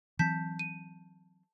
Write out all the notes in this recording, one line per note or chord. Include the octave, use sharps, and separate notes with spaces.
E3 F#3 C4 A5 G6 B6
D#7